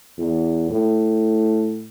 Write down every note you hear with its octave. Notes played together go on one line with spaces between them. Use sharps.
E2
A2